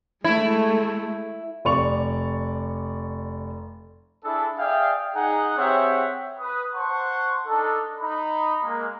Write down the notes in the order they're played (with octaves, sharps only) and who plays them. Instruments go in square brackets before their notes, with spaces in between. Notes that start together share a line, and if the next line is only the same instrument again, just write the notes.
[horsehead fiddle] G#3 A3 [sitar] E4
[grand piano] F1 D5 C#6 F7
[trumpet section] D4 E4 G#4 A4
G#4 D5 E5 F5 G5
D#4 G#4 F#5
C4 G4 G#4 C#5 E5 F#5
B4 D#6
C5 F#5 A5 C6 C#6
D4 D#4 A4
D#4 B5
G#3 A#3